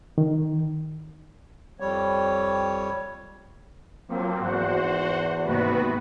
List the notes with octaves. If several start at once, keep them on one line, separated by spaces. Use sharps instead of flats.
D#3
F2 G3 C#5
F3 F#3 A#3 C4
E2 G#2 F#4 C5 F#5
D#2 G#2 C3 B3 F#4 B4